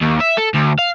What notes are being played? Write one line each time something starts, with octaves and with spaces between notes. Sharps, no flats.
D#2
E5
A4
D2
F5